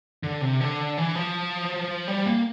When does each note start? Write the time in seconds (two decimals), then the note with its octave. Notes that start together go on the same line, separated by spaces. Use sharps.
0.23 D3
0.41 C3
0.60 D3
0.98 E3
1.15 F3
2.08 G3
2.26 A#3